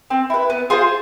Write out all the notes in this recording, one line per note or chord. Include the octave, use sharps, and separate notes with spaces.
C4
E4 B4
B3
F4 G#4 C5